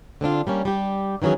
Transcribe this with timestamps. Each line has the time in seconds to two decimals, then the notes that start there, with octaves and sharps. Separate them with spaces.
0.21 D3 C4 D4 F4
0.47 G3 A#3 C#4
0.65 G3 G4
1.22 D#3 E3 F#3 C#4 G#4